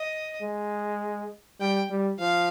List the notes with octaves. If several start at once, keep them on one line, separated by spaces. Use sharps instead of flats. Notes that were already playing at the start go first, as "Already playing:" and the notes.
Already playing: D#5
G#3
G3 G5
G3
F3 F5